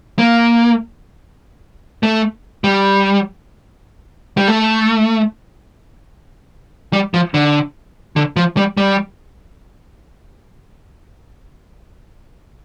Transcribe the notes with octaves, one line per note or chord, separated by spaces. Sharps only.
A#3
A3
G3
G3
A3
G3
F3
D3
D3
F3
G3
G3